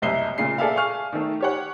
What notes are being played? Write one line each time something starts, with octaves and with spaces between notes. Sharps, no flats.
F#1 C2 D#5 E5 C7 G7
A#2 C#3 C7
G#4 A4 D5 E5 F5
G#4 F5 G#5 C#6 F6
D#3 A3
G4 C#5 F#5